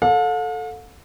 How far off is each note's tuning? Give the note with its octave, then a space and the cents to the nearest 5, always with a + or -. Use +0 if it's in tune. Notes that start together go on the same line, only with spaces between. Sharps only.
A4 +0 F5 +45